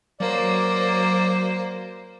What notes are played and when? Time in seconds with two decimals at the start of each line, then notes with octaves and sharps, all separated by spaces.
0.20 F#3 A#3 C5 D5